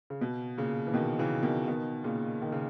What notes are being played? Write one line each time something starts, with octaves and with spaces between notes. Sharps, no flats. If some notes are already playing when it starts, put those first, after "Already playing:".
C#3
B2
A#2 C#3
E3
B2 D#3
C#3 E3
B2 D#3
B2 D#3
A#2 C#3
D#3
C#3